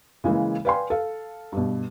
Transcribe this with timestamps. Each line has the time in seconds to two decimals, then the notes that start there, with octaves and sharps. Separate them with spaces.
0.24 C#3 E3 G#3 A#3
0.65 B4 D5 F5 G5 G#5 C6
0.90 A4 F5
1.52 G2 B2